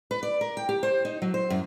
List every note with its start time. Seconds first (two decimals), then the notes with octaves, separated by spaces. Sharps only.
0.11 B4
0.23 D5
0.41 A#4
0.57 G5
0.69 G4
0.83 C5
1.05 D#4
1.22 F#3
1.34 C5
1.50 F#2